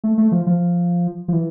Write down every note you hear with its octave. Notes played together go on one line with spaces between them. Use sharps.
A3
A3
F3
F3
F3
E3